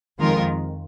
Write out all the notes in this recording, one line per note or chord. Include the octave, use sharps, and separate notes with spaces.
F2 D#3 G#3 F4 A#4